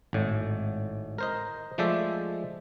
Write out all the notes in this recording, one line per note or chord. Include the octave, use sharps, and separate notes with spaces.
G#1 A2
A#4 C5 D#5
F3 G#3 A3 C5 D5 E5